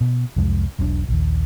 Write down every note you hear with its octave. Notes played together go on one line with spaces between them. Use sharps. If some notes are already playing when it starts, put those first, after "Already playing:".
B2
C2 F2 G3 G#3
E1 B1 C3 D4
A#1 D#2